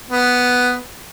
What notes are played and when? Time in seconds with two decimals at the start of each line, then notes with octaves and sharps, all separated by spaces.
0.10 B3